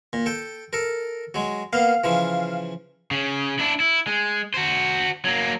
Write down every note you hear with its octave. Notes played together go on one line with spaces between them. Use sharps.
A#2
A4 G5
A4 A#4
F#3 G#3
A#3 B3 F5
C#3 E3 F3
C#3
D4 E4
E4
G#3
F#4 C5
F#3 A#3